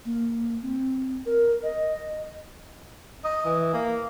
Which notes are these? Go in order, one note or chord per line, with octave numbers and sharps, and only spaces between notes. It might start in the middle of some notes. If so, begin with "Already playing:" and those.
A#3
C4
A#4
D#5
D#5
E3
A#3